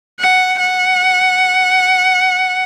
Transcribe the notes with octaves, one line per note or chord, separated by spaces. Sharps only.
F#5
F#5